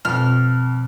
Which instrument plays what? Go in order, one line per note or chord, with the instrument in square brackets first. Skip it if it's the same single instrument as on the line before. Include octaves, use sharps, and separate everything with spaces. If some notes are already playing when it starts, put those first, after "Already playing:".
[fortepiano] F2 [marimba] B2 [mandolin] F6